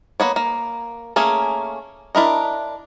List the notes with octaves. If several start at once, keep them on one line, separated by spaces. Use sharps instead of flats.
A#3 B3 C#5
A#3
A3 A#3 C#4 G#4
D4 E4 A#4 D#5